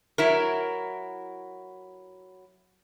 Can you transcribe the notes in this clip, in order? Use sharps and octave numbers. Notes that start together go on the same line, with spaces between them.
F#3 E4 A#4